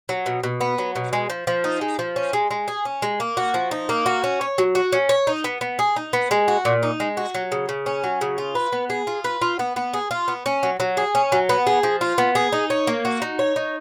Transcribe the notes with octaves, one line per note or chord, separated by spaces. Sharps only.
F#3
B2
B2
B3
F#3
B2
G#3
F3
F3
D#4
G#3
F3
C#4
G#3
G#3
G#4
C#4
G#3
A#3
F#4
F3
D#4
A#3
F#4
C#4
C#5
F#3
F#4
C#4
C#5
D#4
B3
B3
G#4
D#4
B3
G#3
F#4
A#2
D#4
G#3
F#4
F#3
C#3
C#3
C#4
F#3
C#3
F4
B4
B3
G#4
F4
B4
F4
B3
B3
G#4
F4
B3
C#4
F#3
F#3
G#4
C#4
F#3
B3
G#4
F3
F4
B3
G#4
D#4
C#5
A#3
F#4
D#4
C#5
D#4